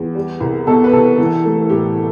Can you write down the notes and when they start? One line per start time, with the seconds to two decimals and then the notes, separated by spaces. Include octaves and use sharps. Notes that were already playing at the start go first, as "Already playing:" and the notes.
Already playing: E2
0.15 G3
0.40 C2
0.67 B2 A4
0.84 B4
0.92 C2 A4
1.18 E3
1.45 A3
1.69 A2 G4